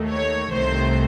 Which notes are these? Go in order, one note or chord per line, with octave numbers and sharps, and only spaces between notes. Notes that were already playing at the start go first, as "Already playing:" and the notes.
Already playing: D#2 D#3 A3
C#5
C2 C3 D#3 A3 C5